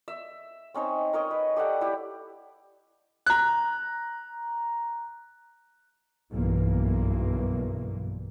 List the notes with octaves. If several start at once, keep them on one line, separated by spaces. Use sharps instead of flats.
E5
C4 C#4 D#4 C#5
A#4 C#5 D#5
B4
G4 A4 D5 F#5
E4 G4
A#5 F#6
F#1 B1 G2 E3 A#3